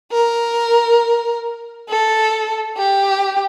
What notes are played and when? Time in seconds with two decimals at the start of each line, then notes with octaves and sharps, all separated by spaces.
0.12 A#4
1.89 A4
2.77 G4